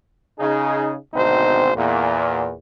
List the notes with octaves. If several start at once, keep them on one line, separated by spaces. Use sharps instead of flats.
C#3 D#4 G#4
G#1 D2 B2 C4 D#4 C5
E2 A#2